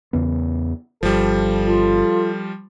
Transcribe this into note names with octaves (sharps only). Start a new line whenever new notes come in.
E2 C#3 B3
G1 F3 G3 A4
F4